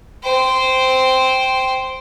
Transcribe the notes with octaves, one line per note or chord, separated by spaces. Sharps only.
C5 G5